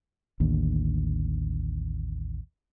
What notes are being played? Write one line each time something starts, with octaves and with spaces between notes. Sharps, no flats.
A1 D#2 D3